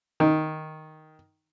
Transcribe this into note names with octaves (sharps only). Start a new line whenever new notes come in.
D#3